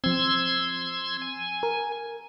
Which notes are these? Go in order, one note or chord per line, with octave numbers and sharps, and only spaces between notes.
F3 C4 C6 E6 G#6
G#5
A#4